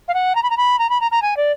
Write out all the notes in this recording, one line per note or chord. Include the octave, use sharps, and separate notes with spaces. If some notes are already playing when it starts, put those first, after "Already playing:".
F5
F#5
A#5
B5
A#5
B5
A#5
B5
A#5
A#5
G#5
D5